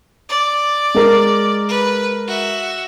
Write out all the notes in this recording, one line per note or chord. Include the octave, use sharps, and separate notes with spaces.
D5
G#3 A#4
B4
F#4 E5